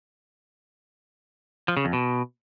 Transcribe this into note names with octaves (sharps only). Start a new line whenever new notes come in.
F3
C#3
F2
B2